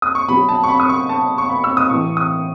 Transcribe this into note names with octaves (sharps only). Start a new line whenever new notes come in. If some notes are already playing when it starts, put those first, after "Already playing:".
D#6
C#6
B2 F#3 B5
A5
C#6
B5
D#6
C#6
A5
C#6
B5
E6
D#6
A2 E3 C#6
D#6